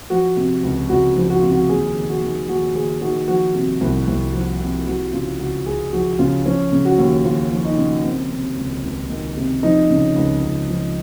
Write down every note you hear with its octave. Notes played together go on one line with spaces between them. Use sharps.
F3 F#4
C3
C#2
C#2 F#4
F3
F#4
C3 F4
F#4
D#2 G#4
D#3
F#4
D#3
D#2 F#4
D#2 G#4
D#3 F#4
F3 F#4
C3
C2
C2
F3
C3
F3 F#4
C#3 F4
C#2 F#4
C#2 G#4
F3 F#4
C#3 F4
F3 C#4
C#3
F#4
D#2
D#2 F4
F3
D#4
C#3
D#3 C4
C3
C#2
C#2
D#3
C3
F3 D#4
C#3
C#2
C#2
F3